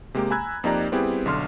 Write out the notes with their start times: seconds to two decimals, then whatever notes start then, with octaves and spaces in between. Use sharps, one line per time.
0.14 C3 G#3 A#3 G4
0.31 G#5 A#5 B5 E6 F#6 G#6
0.64 F2 A#3 D#4 G4 D5 A#5
0.92 G3 B3 C4 E4 G4 G#4
1.26 B1 D3 C6 F6